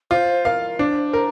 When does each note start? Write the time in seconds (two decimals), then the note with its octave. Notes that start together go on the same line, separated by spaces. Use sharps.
0.11 F4 C5
0.45 A#4 F5
0.79 D4 C5
1.13 A#4